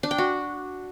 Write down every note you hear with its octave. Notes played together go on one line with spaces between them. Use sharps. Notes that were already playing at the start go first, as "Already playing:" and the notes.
D4
G5
F#4